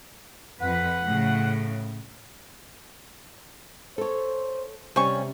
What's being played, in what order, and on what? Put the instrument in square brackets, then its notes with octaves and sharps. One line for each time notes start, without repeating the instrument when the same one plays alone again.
[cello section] F2 B4 [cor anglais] F#5
[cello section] A2 C#3
[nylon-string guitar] A4 C#5 [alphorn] C5
[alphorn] C3 [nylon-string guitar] G3 C#4 [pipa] C5 G#5 C#6